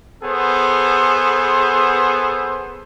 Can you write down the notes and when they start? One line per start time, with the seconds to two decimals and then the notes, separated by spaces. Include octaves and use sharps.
0.24 B3 G#4 A4 C5